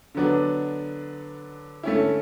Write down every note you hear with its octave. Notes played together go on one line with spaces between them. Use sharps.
D3 F#3 B3 D4
D3 A3 C#4 E4